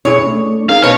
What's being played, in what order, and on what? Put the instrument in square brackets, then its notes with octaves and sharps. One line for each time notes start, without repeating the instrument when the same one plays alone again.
[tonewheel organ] B2 D4 [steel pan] C#4 E4 G#4 [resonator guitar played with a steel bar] C#5
[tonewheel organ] A3 D4
[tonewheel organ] C#4 D#4 A#4 [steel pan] G#4 [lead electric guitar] F5
[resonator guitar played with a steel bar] B2 [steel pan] B4 [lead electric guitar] C#5